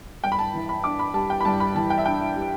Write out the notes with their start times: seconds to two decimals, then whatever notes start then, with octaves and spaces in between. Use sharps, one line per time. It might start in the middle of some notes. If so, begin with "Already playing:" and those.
0.24 G2 G5
0.32 B5
0.39 A5
0.54 E3
0.69 B5
0.84 D4 D6
0.99 B5
1.14 G3 A5
1.30 G5
1.41 B5
1.45 G2 A5
1.60 B5
1.75 E3 A5
1.90 G5
1.98 E5
2.06 D4 G5
2.36 G3